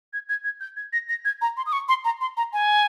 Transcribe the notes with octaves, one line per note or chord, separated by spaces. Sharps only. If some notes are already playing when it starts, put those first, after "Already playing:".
G#6
G#6
G#6
G6
G#6
A#6
A#6
G#6
A#5
C6
D#6
C#6
C6
A#5
C6
A#5
G#5